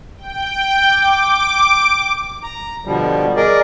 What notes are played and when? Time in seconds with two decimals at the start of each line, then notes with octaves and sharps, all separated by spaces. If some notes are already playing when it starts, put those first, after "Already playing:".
0.17 G5
0.89 D6
2.43 A#5
2.85 B2 D3 F3 G3
3.36 G#4 A#4 D5 D#5